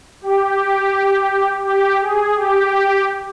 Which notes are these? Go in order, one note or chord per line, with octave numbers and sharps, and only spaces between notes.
G4
G4
G#4
G4